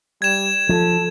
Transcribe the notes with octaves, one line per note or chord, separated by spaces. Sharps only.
G3 G#6 E7
F3 A4